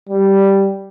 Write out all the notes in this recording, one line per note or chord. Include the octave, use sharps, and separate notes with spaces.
G3